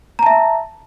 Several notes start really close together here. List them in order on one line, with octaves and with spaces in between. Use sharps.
A#5 A5 E5